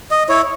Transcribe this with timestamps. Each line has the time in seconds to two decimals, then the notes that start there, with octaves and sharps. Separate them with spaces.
0.11 D#5
0.29 E4 C#5